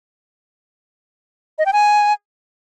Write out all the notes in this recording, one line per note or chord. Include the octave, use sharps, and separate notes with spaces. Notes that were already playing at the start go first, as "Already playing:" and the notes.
D#5
G5
G#5